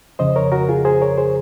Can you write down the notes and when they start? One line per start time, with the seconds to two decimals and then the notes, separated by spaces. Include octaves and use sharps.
0.19 F2 C#3 F3 C5 D#5
0.36 A#4 C#5
0.52 F#4 A#4
0.69 F4 G#4
0.85 G#4 C5
1.01 A#4 C#5
1.18 G#4 C5